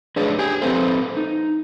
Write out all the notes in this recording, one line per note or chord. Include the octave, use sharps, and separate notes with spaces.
D4 G#4 B4 C#5
G4 G#5
C4 A4 B4 C5
D#4